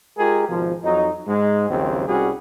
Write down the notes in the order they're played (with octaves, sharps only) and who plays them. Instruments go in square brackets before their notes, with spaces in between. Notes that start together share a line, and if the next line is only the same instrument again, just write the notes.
[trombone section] G#3 F4 G4 G#4 A#4
G#1 B2 F3
F2 F#3 D#4
G#2 G#3
A#1 D#2 C#3 F#3 C4
C2 G3 C#4 F#4 G#4